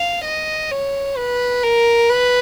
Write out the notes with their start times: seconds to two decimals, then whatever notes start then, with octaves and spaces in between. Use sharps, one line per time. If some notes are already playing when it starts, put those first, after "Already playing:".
Already playing: F5
0.25 D#5
0.71 C#5
1.17 B4
1.63 A#4
2.09 B4